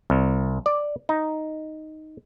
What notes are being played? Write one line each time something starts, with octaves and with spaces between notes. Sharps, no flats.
C2
D5
D#4